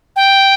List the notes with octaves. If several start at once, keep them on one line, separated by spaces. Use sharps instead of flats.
G5